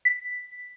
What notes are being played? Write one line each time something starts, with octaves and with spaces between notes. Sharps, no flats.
B6